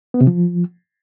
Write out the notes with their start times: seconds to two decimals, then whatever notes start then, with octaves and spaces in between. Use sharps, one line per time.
0.14 B3
0.21 C3
0.27 F3